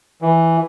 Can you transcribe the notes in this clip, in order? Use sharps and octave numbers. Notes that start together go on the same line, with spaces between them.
E3